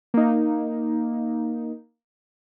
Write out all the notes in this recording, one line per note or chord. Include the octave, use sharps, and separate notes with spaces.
A#3 D#4